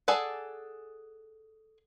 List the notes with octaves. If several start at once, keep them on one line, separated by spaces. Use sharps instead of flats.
G#4 A4 D5 F#5